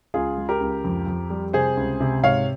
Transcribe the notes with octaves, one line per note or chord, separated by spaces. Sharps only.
C#2 F4 G#4
G#3
G4 A#4
C#2
F2
F2
G3
C3 G#4 C5
C#2
C3
G#2 C#5 F5